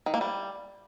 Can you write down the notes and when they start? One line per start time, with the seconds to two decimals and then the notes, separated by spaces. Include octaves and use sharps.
0.06 D#3
0.14 A#3
0.21 G3